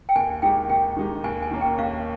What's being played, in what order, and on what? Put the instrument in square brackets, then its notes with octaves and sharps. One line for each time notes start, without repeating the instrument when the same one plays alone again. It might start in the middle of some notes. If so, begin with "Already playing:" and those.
[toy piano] G5
[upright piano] D#2 [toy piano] G#5
[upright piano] D#3 G#3 D#4 G4 [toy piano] G5
[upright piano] D#2 [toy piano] G5
[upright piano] D#3 G#3 D#4 G4
[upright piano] D#2 [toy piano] G#5
[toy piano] G#5
[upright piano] D#3 A#3 C#4
[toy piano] G5
[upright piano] D#2 [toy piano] F5